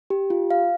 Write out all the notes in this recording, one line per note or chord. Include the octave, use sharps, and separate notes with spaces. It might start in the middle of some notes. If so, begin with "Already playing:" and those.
G4
F4
F5